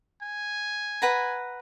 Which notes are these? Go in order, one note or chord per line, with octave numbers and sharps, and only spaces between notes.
G#5
B4 F#5 A#5